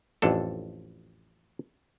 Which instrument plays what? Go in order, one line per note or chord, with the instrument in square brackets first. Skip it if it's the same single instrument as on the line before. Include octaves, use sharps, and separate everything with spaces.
[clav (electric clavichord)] A1 F2 D4 A4